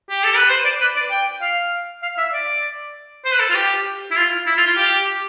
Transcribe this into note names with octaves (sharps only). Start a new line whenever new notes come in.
G4
A4
B4
C5
D5
B4
D5
G5
F5
F5
E5
D5
C5
B4
A4
F4
G4
E4
F4
E4
F4
F4
G4